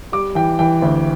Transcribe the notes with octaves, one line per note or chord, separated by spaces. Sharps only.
G3 D6
E3 G5
E3 G5
D2